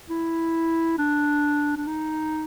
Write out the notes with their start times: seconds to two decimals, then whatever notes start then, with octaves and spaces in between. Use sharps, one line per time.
0.10 E4
0.98 D4
1.77 D4
1.87 D#4